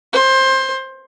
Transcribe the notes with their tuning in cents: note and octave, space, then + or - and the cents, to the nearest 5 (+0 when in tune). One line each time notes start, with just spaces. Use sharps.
C5 +20